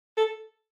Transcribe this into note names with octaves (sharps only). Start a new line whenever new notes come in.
A4